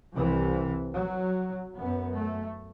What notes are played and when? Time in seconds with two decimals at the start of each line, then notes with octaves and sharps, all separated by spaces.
0.14 C2 C3 E3
0.96 F#3
1.76 F#2 B3
2.16 A3